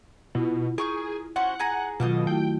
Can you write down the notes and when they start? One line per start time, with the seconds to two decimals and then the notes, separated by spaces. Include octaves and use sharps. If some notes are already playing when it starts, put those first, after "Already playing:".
0.35 B2 E4 F4
0.78 G#4 A#4 C#6 G6
1.36 C#4 F#4 C5 F#5
1.59 G#4 G#5 A#5
2.00 B2 D#3 F#3 A#3 F4 A4 D#5
2.27 A3 E4 F#4 G5